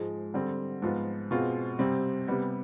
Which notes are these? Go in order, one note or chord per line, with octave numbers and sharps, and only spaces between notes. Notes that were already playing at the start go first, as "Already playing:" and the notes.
Already playing: G#2 F3 G#3
D3 G3 C4
G#2 F3 B3 F4
B2 G#3 C4 F4
C3 G3 C4
C3 G3 B3